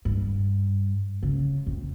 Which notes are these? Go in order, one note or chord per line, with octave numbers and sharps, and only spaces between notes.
G2
C#3
F2